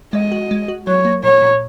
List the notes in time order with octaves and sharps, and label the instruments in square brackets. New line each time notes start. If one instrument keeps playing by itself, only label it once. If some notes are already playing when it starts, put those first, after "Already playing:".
[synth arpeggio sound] G#3 [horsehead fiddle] D#5
[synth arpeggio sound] F#4
G#3
F#4
[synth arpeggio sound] F#3 [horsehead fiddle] C#5
[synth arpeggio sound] A#3
[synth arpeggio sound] A#2 [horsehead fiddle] C#5
[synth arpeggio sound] A#2